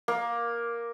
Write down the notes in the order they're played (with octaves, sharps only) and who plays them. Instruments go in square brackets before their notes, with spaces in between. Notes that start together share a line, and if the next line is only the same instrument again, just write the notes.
[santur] A#3